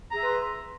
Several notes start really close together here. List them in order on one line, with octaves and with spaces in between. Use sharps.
A#5 G#4 E5 B4 C6